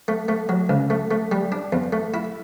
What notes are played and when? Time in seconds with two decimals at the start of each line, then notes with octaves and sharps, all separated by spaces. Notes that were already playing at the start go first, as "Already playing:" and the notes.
0.08 A3
0.28 A3
0.49 F#3
0.69 C#2
0.90 A3
1.11 A3
1.32 G3
1.52 D4
1.73 E2
1.93 A3
2.14 E4